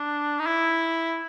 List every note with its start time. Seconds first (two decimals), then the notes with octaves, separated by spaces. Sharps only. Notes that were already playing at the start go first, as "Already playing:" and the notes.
Already playing: D4
0.39 D#4
0.46 E4